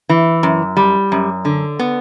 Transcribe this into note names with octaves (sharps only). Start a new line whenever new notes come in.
E3
F#2
G3
F#2
D3
B3